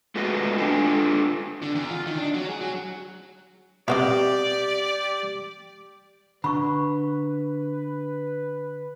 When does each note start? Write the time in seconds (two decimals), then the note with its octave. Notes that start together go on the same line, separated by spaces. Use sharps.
0.16 G#3 A3 F4 F#4 B4 D#5
0.58 D4 F4 A4 G5 G#5
1.62 D3
1.75 E2
1.90 F4
2.07 D#3
2.18 D4
2.34 F#3
2.49 G#4
2.61 F#3
3.88 B2 G3 C4 F#4 G4 D5 D#5 F5
6.44 D3 B4 B5 C#6